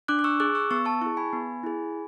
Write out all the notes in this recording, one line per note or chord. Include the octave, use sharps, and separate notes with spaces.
D4 D6 F#6
D6
C#6 E6
G#4 D6 F#6
C#6 E6
B3 C#6 E6
A5 C#6
E4 G#4 A5 C#6
G#5 B5
B3
E4 G#4